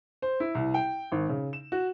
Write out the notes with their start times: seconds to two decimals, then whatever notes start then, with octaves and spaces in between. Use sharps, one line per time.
0.22 C5
0.40 E4
0.55 C2
0.74 G5
1.12 G#1
1.29 C#3
1.53 E7
1.72 F#4